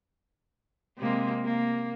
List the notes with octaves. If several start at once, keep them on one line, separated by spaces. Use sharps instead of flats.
C3 G#3 A#3
A#3